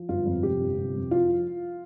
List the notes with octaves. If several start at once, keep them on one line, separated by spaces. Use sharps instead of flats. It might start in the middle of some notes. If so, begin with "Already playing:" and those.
Already playing: F3
G1 F4
F2
C3 G4
G1
C3
F2
F3 F4
F3